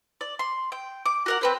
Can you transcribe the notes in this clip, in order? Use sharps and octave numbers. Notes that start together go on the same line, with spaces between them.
D5
C6
G5
D6
F#4 A#4 F#5
C4 B4 C5